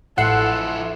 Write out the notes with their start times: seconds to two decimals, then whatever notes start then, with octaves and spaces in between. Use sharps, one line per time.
0.18 A1 F3 E4 A4 F#5 C6